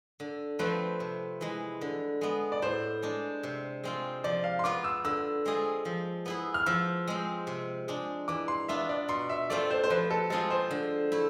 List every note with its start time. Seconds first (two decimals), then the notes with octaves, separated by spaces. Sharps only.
0.20 D3
0.59 F3 A3 C4 B4
1.00 C3
1.41 E3 G#3
1.81 D3
2.21 G#3 B3
2.52 D5
2.62 A2 C5
3.03 G#3 D4
3.43 C3
3.84 G#3 C4 F4
4.24 F3 D5
4.44 F5
4.59 C6
4.64 B3 F4 D6
4.84 E6
5.05 D3 E6
5.46 G#3 C4 F4 G#4
5.85 F3
6.26 B3 E4 G#4
6.54 F6
6.66 F3 E6
7.08 G#3 C4
7.47 C3
7.88 G#3 D4
8.28 E3 D6
8.48 C6
8.68 B3 D4 F4 E5
8.89 D5
9.09 B2 C6
9.29 E5
9.50 A3 C4 F4 D5
9.70 C5
9.84 C5
9.90 F3 B4
10.10 A4
10.30 G#3 C4 F4 G#4 A4
10.50 C5
10.71 D3
11.12 A3 E4